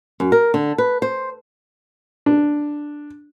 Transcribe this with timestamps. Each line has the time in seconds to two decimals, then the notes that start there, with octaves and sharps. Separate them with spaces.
0.20 F#2
0.32 A#4
0.54 D3
0.78 B4
1.02 C5
2.26 D4